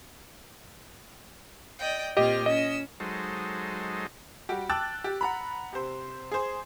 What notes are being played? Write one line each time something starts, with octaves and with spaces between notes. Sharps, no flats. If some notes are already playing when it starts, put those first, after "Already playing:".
D5 D#5 G5
A#2 C4 G4 D#5 F6
C#4 D#5 E6
F#3 G#3 D#4 A4 C5
G3 F#4 G4
G5 A5 D6 E6 F#6 A6
G4
F#5 A#5 B5
C3 C5
G#4 C5